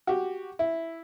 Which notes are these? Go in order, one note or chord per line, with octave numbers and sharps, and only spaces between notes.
F#4 G4
E4